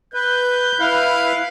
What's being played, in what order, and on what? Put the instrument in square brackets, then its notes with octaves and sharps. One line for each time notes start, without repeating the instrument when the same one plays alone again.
[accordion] B4 [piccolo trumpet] G6
[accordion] E4 B4 [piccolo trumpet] F5